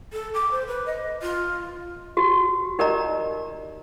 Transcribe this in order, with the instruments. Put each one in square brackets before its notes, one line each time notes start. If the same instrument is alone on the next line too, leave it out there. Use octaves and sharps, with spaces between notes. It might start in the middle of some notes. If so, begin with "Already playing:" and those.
[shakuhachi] A4
D6
C5
B4
D#5
F4
[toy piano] F#4 G4
D#4 G4 A#4 D5 D#5 A#5